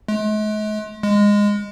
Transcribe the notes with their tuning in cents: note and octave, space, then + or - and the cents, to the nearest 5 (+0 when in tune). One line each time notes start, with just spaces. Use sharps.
G#3 +45
G#3 -15